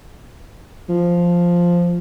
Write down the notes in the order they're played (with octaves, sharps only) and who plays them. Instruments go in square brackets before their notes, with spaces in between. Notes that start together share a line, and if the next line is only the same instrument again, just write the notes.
[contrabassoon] F3